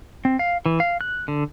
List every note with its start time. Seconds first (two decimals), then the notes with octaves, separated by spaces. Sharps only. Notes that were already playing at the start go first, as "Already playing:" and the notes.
0.25 C4
0.39 F5
0.66 E3
0.80 F5
1.01 F#6
1.28 D3